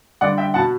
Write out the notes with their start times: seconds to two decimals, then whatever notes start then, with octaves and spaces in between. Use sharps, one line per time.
0.21 G2 D3 D5 F#5
0.38 E5 G5
0.54 B2 F#5 A5